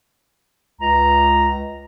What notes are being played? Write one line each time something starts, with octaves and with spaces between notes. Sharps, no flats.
C#2 A#5